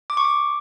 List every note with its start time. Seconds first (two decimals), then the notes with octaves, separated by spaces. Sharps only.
0.10 D6
0.17 C#6
0.25 D6